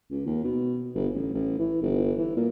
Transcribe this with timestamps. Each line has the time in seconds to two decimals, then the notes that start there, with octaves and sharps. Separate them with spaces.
0.10 C#2
0.26 D#2
0.44 B2
0.95 G1
1.14 A1
1.34 A1
1.59 E3
1.82 G1
2.18 E3
2.36 A#2